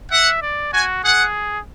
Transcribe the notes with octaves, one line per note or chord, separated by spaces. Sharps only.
E5 F#5
D5
F#4 G#5
G#4 F#5